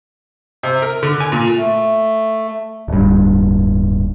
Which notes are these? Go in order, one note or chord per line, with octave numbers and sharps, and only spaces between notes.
C3
A#4
D3
G#5
A#2
A3
D1 G2